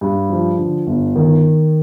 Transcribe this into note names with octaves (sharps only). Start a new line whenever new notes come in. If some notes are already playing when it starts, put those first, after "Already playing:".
G2
F3
D3
G1
D#3